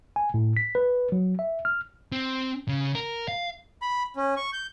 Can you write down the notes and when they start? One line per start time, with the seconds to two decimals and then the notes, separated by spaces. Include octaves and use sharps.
0.16 G#5
0.34 A2
0.57 B6
0.75 B4
1.12 F#3
1.39 E5
1.65 F6
2.12 C4
2.69 C#3
2.95 A#4
3.28 F5
3.82 B5
4.16 C#4
4.36 C#6
4.53 G6